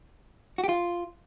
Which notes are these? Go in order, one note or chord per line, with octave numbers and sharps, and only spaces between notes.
F#4
G4
F4